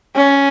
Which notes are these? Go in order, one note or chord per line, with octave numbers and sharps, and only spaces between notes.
C#4